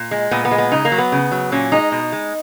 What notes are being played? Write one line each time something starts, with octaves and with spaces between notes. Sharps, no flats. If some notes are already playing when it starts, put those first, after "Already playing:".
Already playing: A#2
G#3
A#2 B3
B3
G#3
B3
C#3 D#4
A#3
F#3
B3
C#3
F#3
A#2 C#4
G#3 D#4
B2
G#3